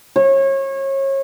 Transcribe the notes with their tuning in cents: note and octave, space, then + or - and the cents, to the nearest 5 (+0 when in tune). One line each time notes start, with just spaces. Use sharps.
C#5 -30